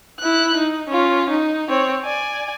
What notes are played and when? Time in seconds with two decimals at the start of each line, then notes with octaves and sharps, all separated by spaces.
0.20 E4 F#6
0.57 D#4
0.89 C#4 F4
1.30 D#4
1.69 C4 C#5
2.04 D5 G#5